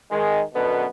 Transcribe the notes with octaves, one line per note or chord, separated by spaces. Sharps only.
D#3 G#3
F#2 B2 D3 B3